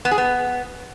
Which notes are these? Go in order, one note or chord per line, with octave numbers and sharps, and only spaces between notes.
B3
G#4
B3